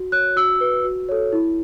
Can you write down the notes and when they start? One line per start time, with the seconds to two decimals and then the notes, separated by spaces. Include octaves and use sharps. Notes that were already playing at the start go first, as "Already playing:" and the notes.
Already playing: F#4
0.12 C#5 F#6
0.36 F#4 E6
0.61 B4
0.84 F#4
1.09 A4 C#5
1.32 E4